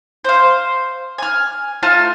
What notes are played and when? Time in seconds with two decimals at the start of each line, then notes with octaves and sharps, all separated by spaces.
0.25 C5 F5
1.18 G#5 F6
1.83 A3 F4 A5 F6